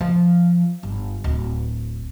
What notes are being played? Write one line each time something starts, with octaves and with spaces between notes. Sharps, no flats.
F3
G1
D1